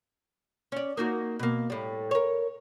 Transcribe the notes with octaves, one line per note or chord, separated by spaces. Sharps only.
C#4 D5
A#3 D#4 F#4
B2 A#3
A2 G3
A#4 C#5